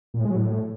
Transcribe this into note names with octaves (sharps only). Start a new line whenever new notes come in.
A#2
A2
G#3
F#3
A2